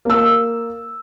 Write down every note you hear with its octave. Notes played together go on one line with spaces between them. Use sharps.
A#3 E6